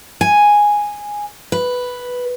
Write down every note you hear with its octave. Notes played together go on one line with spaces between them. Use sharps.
G#5
B4